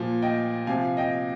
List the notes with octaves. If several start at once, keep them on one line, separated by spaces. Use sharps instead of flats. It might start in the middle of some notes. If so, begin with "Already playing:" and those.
Already playing: A#2 F3
D#5 G5
C3 F3 F5 G#5
D#5 G5